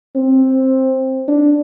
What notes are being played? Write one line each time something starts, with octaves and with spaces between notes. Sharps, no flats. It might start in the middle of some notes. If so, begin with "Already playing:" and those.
C4
D4